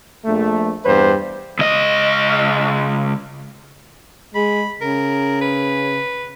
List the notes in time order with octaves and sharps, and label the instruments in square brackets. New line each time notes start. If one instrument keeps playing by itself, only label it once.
[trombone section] A#1 A3
E2 G2 B4 C5
[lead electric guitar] C#2 D#5
[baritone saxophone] G#3 [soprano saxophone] B5
[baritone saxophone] C#3 [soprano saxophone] A#4
[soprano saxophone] B4